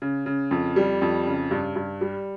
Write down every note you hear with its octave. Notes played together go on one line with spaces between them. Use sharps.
C#3
C#3
F2
G3
F2
C#3
G2
G2
G3